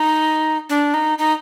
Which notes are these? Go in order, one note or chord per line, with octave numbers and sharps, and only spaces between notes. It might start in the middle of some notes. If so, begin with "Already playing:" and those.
Already playing: D#4
D4
D#4
D#4